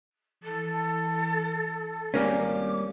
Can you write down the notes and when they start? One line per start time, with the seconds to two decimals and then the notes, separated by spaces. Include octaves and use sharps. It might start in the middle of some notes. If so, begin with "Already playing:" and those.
0.43 E3 A4
2.14 G#1 G3 A#3 C#4 D6